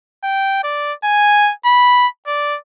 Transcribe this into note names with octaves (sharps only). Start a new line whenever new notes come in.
G5
D5
G#5
B5
D5